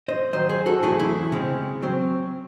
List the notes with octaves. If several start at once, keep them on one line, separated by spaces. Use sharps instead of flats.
C5 D#5
G#2 D#3 F#3 C5 D#5
G#4 C5
F#4 A4
E2 C3 F#3 A3 E4 G#4
E4
C#3 G#3 C4
F#3 C4